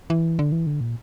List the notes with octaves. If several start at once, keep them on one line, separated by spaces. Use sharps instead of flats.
E3
D3
E3
D3
A#2